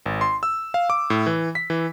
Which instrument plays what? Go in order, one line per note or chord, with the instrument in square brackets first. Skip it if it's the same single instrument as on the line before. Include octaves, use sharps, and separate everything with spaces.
[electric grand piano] G#1
C6
E6
F5
D6
A2
E3
B6
E3